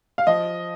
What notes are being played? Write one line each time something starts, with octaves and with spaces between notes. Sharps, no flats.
F5
F3 D#5